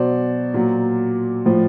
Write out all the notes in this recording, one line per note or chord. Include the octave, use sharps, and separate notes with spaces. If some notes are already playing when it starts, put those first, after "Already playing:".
Already playing: B2 F#3 C5 D5
A#2 F#3
A2 F3